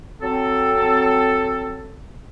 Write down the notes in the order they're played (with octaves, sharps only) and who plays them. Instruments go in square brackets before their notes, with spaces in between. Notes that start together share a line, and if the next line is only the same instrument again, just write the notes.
[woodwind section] F#3 C4 A4